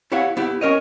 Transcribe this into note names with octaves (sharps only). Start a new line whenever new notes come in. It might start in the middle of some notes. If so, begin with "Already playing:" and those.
E4 G4 C#5 F5 F#5
B3 E4 G4
C#4 A#4 C#5 D#5